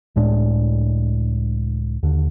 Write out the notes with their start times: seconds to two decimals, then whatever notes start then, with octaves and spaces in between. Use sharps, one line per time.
0.16 C#2 A2 G#3 D4
2.03 D#2 D3